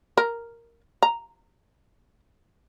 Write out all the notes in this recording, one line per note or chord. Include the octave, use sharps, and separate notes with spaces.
A#4
A#5